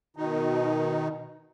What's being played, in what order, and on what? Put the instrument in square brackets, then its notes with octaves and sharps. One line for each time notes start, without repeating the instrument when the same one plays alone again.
[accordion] B2 D#3 D#4